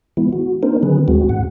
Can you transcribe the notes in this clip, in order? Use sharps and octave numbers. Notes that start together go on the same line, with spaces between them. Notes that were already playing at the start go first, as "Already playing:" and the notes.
E3 G#3 B3 E4
F#4
A#3 C4 D4 D#4 A#4 C5
D3 D#3 F#3 C4 G#4 B4
D#2 G#3 C4 F#4
G#2 F#5